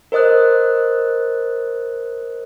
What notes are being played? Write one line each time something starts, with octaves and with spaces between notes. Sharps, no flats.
A#4 C5 D#5 D#6 F#6